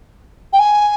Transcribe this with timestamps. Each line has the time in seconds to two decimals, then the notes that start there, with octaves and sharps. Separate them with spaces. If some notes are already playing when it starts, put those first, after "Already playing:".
0.53 G5
0.59 G#5